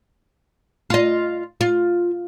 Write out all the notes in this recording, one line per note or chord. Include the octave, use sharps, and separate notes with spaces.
F4 D#5
F4